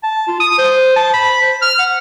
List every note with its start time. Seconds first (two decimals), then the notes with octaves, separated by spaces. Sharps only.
0.03 A5
0.28 F4
0.40 D#6
0.58 C5
0.96 A5
1.14 B5
1.42 C5
1.62 F6
1.79 F#5